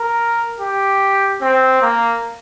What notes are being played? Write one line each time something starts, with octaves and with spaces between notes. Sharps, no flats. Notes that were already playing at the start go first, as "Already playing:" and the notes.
Already playing: A#4
G4
C4
A#3